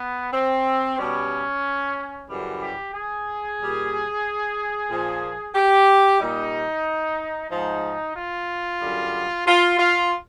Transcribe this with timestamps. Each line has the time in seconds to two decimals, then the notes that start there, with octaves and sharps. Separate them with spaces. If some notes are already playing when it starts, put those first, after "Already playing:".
Already playing: B3
0.32 C4
0.98 B2 G3 C#4
2.28 F#2 C#3 E3 G3
2.61 G4
2.93 G#4
3.59 A#2 G3
4.89 A#2 F3
5.55 G4
6.20 A#2 G3 D#4
7.50 G#2 F3 D#4
8.15 F4
8.81 F#2 D3 G3
9.46 F4
9.78 F4